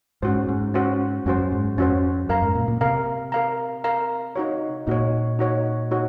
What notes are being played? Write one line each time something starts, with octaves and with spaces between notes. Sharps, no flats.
G#2 C#4 F#4 C5
G#2
C#4 F#4 C5
F#2 C#4 F#4 C5
G#2
F2 C#4 F#4 C5
F#2 A#4 F5 A#5
G#2
A#2
A#2
C3 A#4 F5 A#5
A#4 F5 A#5
A#4 F5 A#5
D#4 F#4 C#5
A#2 D#4 F#4 C#5
D#4 F#4 C#5
D#4 F#4 C#5